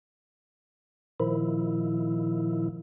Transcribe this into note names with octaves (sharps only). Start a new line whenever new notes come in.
A#2 D#3 F3 E4